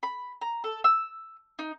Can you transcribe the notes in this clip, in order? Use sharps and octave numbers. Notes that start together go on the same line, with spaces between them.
B5
A#5
A4
E6
D#4